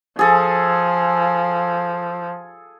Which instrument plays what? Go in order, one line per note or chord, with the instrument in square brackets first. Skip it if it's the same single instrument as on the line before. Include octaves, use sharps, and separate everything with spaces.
[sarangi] F3 [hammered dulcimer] G#4 A4